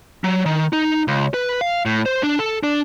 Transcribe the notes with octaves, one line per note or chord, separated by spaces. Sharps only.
F#3
D#3
D#4
C#2
B4
F5
A2
C5
D4
A4
D4